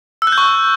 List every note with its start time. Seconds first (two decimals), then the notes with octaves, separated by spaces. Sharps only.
0.22 E6
0.27 F#6
0.32 G6
0.38 C#6